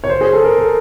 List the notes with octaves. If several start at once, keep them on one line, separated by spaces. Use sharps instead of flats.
C#5
C5
G#4
A4
A#4
A4